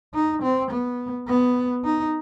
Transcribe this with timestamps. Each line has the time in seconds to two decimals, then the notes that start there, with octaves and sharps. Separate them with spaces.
0.14 D#4
0.42 C4
0.71 B3
1.28 B3
1.84 D#4